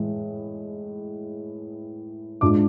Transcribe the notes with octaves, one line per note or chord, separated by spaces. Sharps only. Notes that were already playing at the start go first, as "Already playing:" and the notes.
Already playing: A2 E3 G#3
G#2 G#3 D4 F4 D6